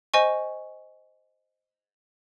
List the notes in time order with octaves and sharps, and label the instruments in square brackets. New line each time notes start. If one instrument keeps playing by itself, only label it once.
[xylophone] C5 D#5 G#5 C#6